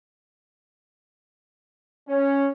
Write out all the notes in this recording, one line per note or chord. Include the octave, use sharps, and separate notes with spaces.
C#4